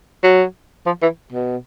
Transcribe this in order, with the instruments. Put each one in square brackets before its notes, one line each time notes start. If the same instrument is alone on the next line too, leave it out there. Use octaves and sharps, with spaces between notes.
[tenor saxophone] F#3
F3
E3
B2